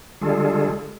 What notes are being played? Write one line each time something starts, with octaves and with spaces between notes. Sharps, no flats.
D3 G3 G#3 F4 G#4 A4